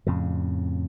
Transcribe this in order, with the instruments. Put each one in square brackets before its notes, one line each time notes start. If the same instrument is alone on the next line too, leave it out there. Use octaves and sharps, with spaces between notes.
[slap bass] F2 A2 C#3